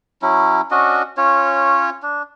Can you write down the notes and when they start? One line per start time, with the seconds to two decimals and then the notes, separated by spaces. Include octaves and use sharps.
0.22 F#3 C#4 E4
0.71 C#4 D4 F#4 D#5
1.17 C#4 F4 C#5
2.03 D4